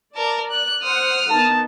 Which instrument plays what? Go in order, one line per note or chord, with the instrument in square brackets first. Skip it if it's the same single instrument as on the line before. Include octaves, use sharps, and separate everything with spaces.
[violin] A#4 A5 [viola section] D5
[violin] F#6
[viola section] C5 F#5 [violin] D#6 F6
[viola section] D#3 B3 D#4 [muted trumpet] A5